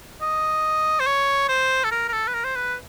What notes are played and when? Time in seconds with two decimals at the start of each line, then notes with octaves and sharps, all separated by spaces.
0.22 D#5
1.00 C5
1.07 C#5
1.49 C5
1.84 A4
1.91 A#4
2.09 A#4
2.13 A4
2.27 B4
2.34 A#4
2.45 C5
2.56 B4